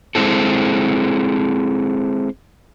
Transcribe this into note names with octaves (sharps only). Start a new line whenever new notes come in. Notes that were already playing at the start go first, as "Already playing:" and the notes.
G#3 C4 E4 A4